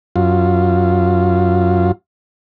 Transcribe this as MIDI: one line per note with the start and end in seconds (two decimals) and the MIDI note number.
0.16 1.92 42
0.16 1.92 65